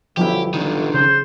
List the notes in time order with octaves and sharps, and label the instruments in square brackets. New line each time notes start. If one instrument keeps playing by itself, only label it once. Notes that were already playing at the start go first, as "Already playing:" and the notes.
[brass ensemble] G1 [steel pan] F3 F#3 E4 [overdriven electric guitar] G4
[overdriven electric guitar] D3 D#3
[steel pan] C#3 [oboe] C5